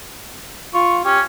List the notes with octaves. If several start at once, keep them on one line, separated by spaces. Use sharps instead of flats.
F4 C#6
C#4 G4